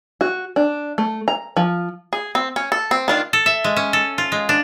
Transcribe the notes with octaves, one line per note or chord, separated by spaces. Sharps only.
F#4
D4
A3
A#5
F3
G#4
C4
C#4
A4
C4
D#3 D4 F4
A4
E5
G#3
C#4
A4
F4
G#3
D4